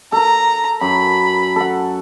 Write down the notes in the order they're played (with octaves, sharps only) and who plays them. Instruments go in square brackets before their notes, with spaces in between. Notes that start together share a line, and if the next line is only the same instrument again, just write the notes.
[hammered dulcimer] A4 A#4 [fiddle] A#5
[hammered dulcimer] F#2 [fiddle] B5
[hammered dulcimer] A4 F#5